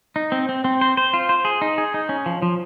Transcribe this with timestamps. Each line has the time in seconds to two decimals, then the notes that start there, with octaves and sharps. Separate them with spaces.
0.16 D#4
0.32 C4
0.49 C4
0.64 C4
0.81 C5
0.97 C5
1.14 F4
1.29 C5
1.45 G#4
1.62 D#4
1.78 G#4
1.94 D#4
2.09 C#4
2.26 F3
2.42 F3